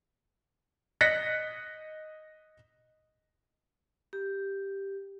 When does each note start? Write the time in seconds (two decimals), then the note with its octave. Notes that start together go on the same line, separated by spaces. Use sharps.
1.01 D#5 F#6 A#6 B6 C#7
4.13 G4